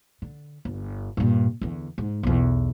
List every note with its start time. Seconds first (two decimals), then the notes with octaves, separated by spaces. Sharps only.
0.22 D3
0.65 G1
1.17 G2 A#2
1.61 E2 D3
1.98 G#2
2.23 B1 E2